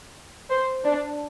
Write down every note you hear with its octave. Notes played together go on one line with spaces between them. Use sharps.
C5
D4